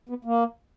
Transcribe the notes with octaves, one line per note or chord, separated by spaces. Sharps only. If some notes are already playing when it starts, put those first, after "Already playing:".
B3
A#3